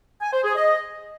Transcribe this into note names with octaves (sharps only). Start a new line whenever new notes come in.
G#5
C5
G#4
D#5